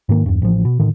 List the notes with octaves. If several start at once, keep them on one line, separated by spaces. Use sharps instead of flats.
G#2 D#3 A#3
E2 G2
A1 F3
B2
A2 D3 D#3